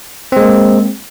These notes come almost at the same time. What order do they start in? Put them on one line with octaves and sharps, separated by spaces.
C4 G#3 A#3